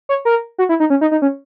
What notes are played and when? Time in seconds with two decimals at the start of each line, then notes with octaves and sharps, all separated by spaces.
0.09 C#5
0.25 A#4
0.58 F#4
0.69 E4
0.80 D#4
0.90 C#4
1.01 D#4
1.11 D#4
1.22 C#4